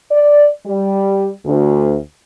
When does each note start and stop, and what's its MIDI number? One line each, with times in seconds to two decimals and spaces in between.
0.12 0.49 74
0.66 1.30 55
1.46 1.97 38